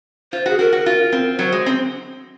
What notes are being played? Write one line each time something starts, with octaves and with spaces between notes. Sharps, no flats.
F4 C5
F#4 G#4
F#4 A#4
F#4
F4
C4
F#3 C5
G#3
C4